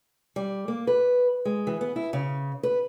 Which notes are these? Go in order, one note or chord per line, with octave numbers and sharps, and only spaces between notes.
G3
A#3
B4
G#3
E3
B3
E4
C#3
B4